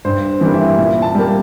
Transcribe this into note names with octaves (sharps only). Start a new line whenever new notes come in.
G2 C5
E3 G3 A#3
E5
A#2 E5
A5
G3 A#3